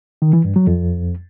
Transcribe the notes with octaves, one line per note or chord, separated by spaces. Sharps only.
D#3
E3
G2
F#3
F2